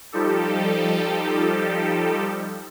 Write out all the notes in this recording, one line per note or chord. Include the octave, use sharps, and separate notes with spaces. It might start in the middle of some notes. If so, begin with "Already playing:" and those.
F3 G3 D#4 G4 A4